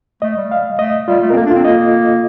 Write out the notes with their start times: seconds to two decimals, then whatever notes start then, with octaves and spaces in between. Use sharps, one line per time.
0.22 A3 D#5
0.37 G3
0.52 F5
0.79 A3 D#5
1.08 G3 F4
1.22 A3
1.30 C4 A#4
1.36 A#3 A4
1.46 D4
1.51 C4 F4
1.64 A#3 D#5